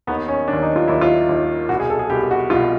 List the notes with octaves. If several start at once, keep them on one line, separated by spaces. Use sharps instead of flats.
D#2 D#3 B3
C#4
D#3 D4
D#2
D#4
F4
D#2 D#3 E4
F4
D#2 D#3
C2 B2 F#4
G#4
A4
G#4
C2 B2 G4
F#4
C2 B2 F4